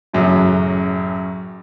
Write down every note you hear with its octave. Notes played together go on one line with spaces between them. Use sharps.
A1 F#2 C#3